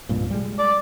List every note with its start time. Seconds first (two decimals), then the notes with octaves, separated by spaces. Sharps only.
0.09 C2 G2 A#2
0.30 G3 G#3
0.59 D5